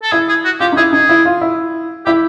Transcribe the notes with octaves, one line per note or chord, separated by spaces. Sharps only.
A4
E4 G#4
G#4
F#4
F4 G4
D#4
E4 G#4
D#4 G#4
E4
F4
E4
E4 G4